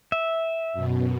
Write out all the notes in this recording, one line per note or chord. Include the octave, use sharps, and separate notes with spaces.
E5
F#2 B2